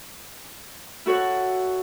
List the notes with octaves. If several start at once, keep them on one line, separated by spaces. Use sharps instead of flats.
E4 F#4 A4 C#5 F#5